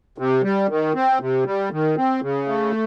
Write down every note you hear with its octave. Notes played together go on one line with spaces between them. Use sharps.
C3
G3
D#3
C4
C3
G3
D#3
C4
C#3
A3